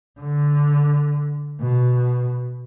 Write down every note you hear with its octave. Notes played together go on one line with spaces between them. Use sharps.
D3
B2